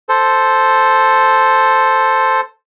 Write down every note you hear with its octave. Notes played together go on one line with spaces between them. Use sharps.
A4 C5